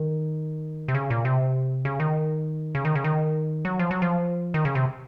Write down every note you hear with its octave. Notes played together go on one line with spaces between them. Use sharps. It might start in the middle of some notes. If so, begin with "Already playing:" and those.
Already playing: D#3
C3
C#3
A#2
C3
C#3
D#3
C#3
D#3
C#3
D#3
F#3
F3
F#3
F3
D#3
C#3
C3